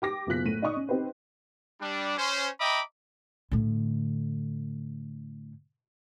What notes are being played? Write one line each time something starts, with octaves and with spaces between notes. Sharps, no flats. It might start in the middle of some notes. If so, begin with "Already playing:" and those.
G4 D6 A#6
F#1 B2 F4 F#6 B6
A2 D#7
D#4 D5 D#5 C#6 D#6
C#4
C4 D#4 G4 B4 C5
G3 D4
C#4 C5
D#5 E5 G5 A#5 B5 D6
A2 D3